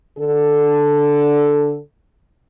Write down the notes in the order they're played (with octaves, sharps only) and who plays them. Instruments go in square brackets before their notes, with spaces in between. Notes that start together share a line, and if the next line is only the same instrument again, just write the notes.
[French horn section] D3 A4